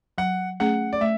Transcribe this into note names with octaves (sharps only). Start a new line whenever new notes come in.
F#3 F#5
A3 C#4 G#4 F#5
D5
A3 E5